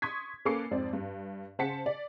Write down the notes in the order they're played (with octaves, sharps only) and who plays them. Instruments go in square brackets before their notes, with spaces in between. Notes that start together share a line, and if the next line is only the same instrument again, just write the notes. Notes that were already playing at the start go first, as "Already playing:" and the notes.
[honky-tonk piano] C6 C#6 D#6 G#6 B6
A#3 C#4 A4 B4 D6 C7
F2 G#2 C4 D5
G2
C#3 C5 F#5 A5 B6 C#7
D5